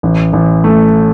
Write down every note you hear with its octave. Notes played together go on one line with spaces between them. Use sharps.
A1
A1
A3